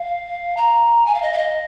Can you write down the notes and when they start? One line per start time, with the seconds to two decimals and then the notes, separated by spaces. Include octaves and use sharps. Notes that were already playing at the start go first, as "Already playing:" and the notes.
Already playing: F5
0.57 A#5
1.06 G#5
1.14 F5
1.22 D#5
1.33 F5
1.38 D#5